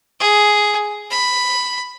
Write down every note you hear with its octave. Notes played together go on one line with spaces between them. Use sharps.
G#4
B5